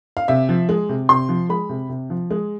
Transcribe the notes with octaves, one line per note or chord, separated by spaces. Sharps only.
F5
C3 E5
F3
G#3
C3
C3 C6
F3
G#3 B5
C3
C3
F3
G#3